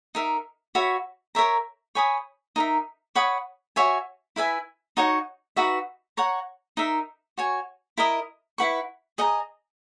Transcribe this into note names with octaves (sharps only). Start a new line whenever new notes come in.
D#4 A#4 E5
F#4 C#5 E5 B5
A#4 C#5 E5 A#5
C#5 G#5 B5 D#6
D#4 A#4 E5
C#5 F#5 B5 D#6
F#4 C#5 E5 G#5
E4 B4 E5 G#5
D#4 F#4 C#5 F#5
D#4 F#4 B4 E5
C#5 F#5 A#5
D#4 A#4 E5
F#4 C#5 G#5
E4 A#4 D#5
E4 B4 F#5 C#6
G#4 D#5 F#5 A#5